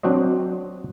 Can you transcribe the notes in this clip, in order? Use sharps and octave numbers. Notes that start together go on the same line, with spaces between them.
F#3 C4 D4 F#4 C5 D#5